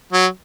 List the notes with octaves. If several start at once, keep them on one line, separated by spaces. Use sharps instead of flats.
F#3